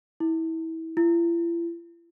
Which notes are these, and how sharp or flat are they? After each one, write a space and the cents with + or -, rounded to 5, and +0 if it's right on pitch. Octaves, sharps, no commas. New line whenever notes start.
E4 -25
E4 +45